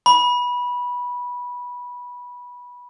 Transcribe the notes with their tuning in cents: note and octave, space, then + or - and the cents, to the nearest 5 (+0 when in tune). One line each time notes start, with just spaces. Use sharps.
B5 -15